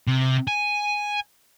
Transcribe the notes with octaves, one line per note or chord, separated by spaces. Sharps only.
C3
G#5